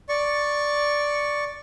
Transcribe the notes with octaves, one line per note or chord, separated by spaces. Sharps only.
D5 C#6